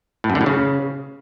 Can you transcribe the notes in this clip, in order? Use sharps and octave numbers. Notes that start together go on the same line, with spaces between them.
A2
F#2
D3
A2
C#3